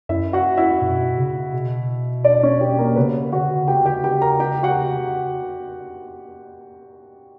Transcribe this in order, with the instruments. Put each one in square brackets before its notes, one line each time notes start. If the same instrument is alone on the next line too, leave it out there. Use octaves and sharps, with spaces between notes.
[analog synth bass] F#2 [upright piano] E4 E5
[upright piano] F#4 F#5
E4 E5
[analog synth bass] B2
C#3
B2
[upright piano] D4 D5
C#4 C#5
G4
A#3 A#4
[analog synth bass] C#3 [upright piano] B3 B4
[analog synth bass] D3 [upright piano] F#4 F#5
[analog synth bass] C#3 [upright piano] G4 G5
[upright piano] G4 G5
G4 G5
A#4 A#5
G4 G5
F#4 F#5